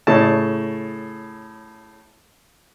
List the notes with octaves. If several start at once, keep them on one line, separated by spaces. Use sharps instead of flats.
A2 C#3 A5